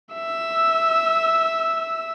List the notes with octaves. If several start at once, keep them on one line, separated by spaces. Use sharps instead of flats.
E5 E6